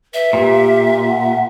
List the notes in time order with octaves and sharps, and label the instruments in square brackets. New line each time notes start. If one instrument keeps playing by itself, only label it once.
[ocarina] B4 [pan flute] E5
[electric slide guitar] A#2 [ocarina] G4
[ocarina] F#5